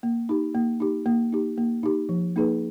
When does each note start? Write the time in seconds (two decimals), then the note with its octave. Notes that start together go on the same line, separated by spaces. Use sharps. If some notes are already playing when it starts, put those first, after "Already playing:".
0.03 A#3
0.29 D#4 G4
0.55 A#3
0.80 D#4 G4
1.06 A#3
1.33 D#4 G4
1.58 A#3
1.83 D#4 G4
2.09 F3
2.36 A#3 D#4 G#4 B4